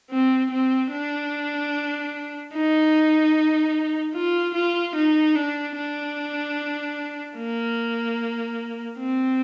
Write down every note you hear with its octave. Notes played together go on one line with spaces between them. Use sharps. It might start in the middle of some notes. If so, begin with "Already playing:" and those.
C4
C4
D4
D#4
F4
F4
D#4
D4
D4
A#3
C4